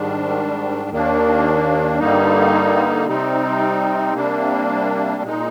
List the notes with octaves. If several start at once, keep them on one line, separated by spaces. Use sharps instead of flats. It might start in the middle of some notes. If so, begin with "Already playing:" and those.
Already playing: G#2 D#3 G3 D4
D#2 D#3 A#3 D4
G2 D3 G3 A#3 D#4
C3 G3 C4 D#4
C3 G3 A#3 D4
A#2 G#3 D#4